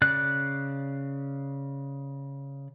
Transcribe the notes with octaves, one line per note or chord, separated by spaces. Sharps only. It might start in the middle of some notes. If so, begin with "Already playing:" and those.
C#3 D5 F#6